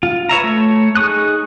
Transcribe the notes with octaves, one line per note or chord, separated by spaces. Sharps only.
F4
B4 C#5 E5 A#5
A3 C#5
D#4 G#4 C#6 D#6 F#6